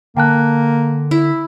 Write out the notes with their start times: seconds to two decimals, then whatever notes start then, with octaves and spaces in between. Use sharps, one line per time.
0.17 D3 A#3 G5 A5 F#6
1.11 E4